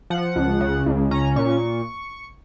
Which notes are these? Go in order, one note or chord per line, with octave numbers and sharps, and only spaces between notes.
F3 F#5
C#2
C#3
C#2
C#4 A#5
A#2 C#6